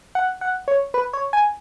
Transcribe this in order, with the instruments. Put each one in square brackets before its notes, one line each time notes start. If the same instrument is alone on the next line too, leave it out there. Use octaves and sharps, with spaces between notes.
[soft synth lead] F#5
F#5
C#5
B4
C#5
G#5